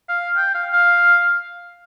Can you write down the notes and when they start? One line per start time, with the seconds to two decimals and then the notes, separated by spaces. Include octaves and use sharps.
0.09 F5
0.37 G5
0.54 F5
0.73 F5